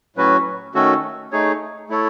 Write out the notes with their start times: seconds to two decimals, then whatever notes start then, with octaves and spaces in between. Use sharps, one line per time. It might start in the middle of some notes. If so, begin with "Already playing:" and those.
0.16 A2 F#3 C#4 F#4 B4
0.74 D#3 A3 C#4 F#4 A4
1.32 A3 D#4 G#4 C#5
1.89 A3 E4 A4 C#5